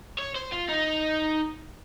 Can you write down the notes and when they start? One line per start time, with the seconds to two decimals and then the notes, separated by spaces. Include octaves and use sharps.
0.18 C#5
0.35 C5
0.52 F4
0.68 D#4